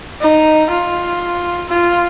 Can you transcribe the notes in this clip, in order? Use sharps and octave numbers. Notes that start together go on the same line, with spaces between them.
D#4
F4
F4